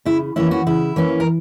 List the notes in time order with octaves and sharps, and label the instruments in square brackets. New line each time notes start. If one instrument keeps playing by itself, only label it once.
[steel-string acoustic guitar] C#3 E4
E3 A#3 C#4 E4
F#4
C#3 E4
E3 A#3 C#4
A#4